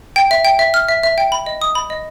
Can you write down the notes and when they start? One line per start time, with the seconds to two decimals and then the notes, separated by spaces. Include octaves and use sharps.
0.16 G5
0.31 E5
0.45 G5
0.59 E5
0.74 F6
0.89 E5
1.03 E5
1.18 G5
1.32 B5
1.46 D#5
1.62 D#6
1.75 B5
1.90 D#5